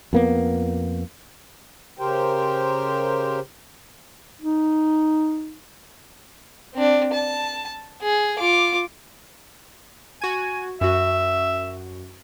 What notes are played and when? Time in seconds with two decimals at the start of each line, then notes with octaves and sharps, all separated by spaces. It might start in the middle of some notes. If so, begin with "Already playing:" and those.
0.13 F2 A#3 B3
1.99 C#3 G4 A#4 C5 G5
4.41 D#4
6.74 C4 D4
7.13 A5
8.02 G#4
8.39 F4 D6
10.22 F#4 G#5 G#6
10.81 F#2 F#4 E5